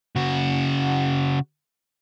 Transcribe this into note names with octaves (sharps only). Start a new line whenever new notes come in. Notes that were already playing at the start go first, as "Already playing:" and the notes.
C#3 F#4